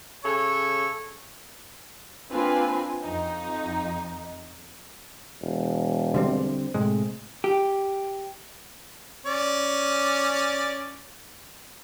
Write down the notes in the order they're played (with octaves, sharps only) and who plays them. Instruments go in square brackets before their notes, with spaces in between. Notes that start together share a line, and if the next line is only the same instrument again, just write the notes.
[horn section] C#3 A4 C#5
[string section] A#3 C4 D4 F4 B4 G#5
F2 D#4
[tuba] E1
[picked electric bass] D3 G3 C4
A2 C3 G#3
[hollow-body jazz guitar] G4
[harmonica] C#4 D5